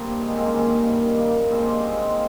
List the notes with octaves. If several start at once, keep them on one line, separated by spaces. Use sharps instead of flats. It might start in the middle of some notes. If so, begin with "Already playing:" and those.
Already playing: G2 A#3 C4 A#4
G#2 D#3 G#3
A#3
G#3 C4
A#3 C#4
G2 D#3
G2 D#3
A#2 F3 A#3
G2 F3 G#3 C4
A#3
G#2 F3 G#3